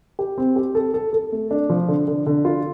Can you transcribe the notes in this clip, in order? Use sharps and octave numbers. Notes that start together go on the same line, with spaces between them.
G4
C4
G4
A4
A4
A4
A3
D4
F3
D3
D3
D3
F4